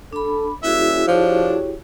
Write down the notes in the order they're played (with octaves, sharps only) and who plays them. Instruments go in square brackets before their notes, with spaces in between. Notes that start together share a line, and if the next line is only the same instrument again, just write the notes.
[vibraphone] D4 B5 [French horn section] A4
[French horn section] G3 A#3 C#4 [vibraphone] E4 F#4 G#4 [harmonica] E5
[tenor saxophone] F3 [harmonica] D4 [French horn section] G4 C#5